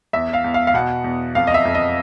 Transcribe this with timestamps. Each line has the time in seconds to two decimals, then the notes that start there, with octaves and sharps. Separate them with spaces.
0.13 E2 E5
0.33 F5
0.44 E2
0.54 F5
0.67 F5
0.74 B2 F#5
1.04 E2
1.35 F2 F5
1.47 D#5
1.54 E5
1.65 F2
1.75 D#5